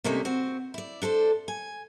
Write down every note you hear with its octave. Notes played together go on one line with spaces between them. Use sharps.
C3 G3 A3 A#3 C#4 D#4
C4 F#4
E4 D5
D4 A4 B4 C5
G#5